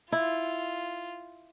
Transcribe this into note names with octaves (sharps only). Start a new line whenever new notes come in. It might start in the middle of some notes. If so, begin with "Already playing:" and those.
E4 F4